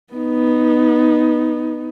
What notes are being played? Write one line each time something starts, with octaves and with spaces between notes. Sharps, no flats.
B3 D#4